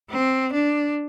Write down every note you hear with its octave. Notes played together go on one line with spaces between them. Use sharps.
C4
D4